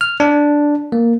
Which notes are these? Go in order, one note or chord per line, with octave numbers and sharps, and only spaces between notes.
F6
D4
A#3